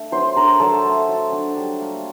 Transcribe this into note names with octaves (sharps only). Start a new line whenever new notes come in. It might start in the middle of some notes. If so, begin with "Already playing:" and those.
Already playing: A3 D4
F#3 C5 C6
D4 A#4 A#5
F#3 A4 A5
A3
F#3
D4
G3
A#3